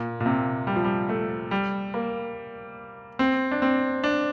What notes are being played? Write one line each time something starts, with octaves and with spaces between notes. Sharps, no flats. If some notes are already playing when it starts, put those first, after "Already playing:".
Already playing: A#2
A#2
C3
G3
F3
G3
A3
G3
A#3
C4
D4
C4
D4